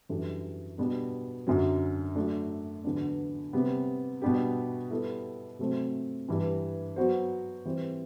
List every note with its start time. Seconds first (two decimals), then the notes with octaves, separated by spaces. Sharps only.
0.09 F#2 E3 G3 D4 A4
0.78 B2 G3 B3 D4
1.47 F#2 D3 F#3
2.15 F#3 A3 D4
2.84 E2 D3 F#3 B3 D4
3.53 C3 G3 B3
4.22 B2 G3 B3 D4 G4
4.91 G3 B3 E4 A4
5.59 C3 F#3 A3 C4
6.28 G2 E3 G3
6.96 F#3 B3 F#4 C5
7.65 E3 G3 C4